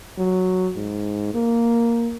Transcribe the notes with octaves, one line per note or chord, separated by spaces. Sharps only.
F#3
G#2
A#3